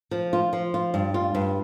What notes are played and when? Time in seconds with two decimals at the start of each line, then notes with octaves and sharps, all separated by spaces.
0.11 F3
0.33 F4
0.53 F3
0.74 F4
0.94 G2
1.14 F4
1.35 G2